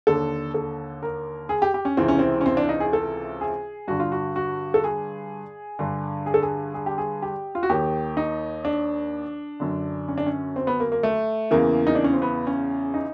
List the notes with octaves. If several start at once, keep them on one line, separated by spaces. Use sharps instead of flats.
D#2 D3 A4
A4
A#4
G#4
G4
G4
C#4
C#2 C3 E3 C4
C#4
C4
C#4
C4
D4
D#4
G#4
A4
G#4
G2 D3 F#4
F4
F#4
F#4
A4
G#4
G2 D3
G#4
A4
G#4
G#4
G4
G#4
G4
F4
F#4
D#2 D#3 G4
D#4
D4
F#2 D3
C#4
D4
C#4
C4
B3
A#3
A#3
A3
E2 C#3 E3 A#3
D#4
D4
C#4
C4
B3
C#4
D#4